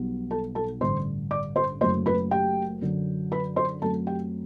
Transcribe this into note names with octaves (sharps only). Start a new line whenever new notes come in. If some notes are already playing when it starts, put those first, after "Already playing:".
Already playing: B1 B2 G3 B3
A4 A5
A4 A5
A1 G2 D3 C5 C6
D5 D6
C5 C6
F#1 F#2 F#3 A3 C5 C6
B4 B5
G4 G5
F#2 D3 F#3
B4 B5
C5 C6
F#2 F#3 A3 C4 A4 A5
G4 G5